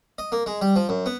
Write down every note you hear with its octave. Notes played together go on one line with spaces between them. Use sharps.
D#5
A#3
G#3
G3
F3
F#2
B3